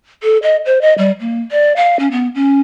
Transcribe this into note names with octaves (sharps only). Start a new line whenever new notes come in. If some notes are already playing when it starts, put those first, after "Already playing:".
A4
D#5
C5
D#5
G3
A#3
D5
F5
C#4
B3
C#4